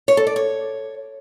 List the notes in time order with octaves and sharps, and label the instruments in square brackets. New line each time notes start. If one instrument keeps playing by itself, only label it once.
[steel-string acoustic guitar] C#5
A4
D5
C#5